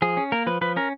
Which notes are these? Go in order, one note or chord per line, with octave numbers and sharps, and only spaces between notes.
F3 G#4
C#4
A#3 A#4
F3 B4
F3 B4
C#4 A#4